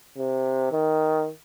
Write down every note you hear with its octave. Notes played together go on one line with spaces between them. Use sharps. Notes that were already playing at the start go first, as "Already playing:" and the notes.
C3
D#3